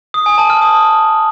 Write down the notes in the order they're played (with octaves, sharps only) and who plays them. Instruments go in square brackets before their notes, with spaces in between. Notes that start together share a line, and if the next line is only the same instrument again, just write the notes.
[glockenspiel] D#6
G#5
A5
F6
D#6